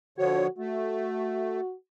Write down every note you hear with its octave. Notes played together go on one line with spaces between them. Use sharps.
D3 F3 F#4 C#5
A3 F#4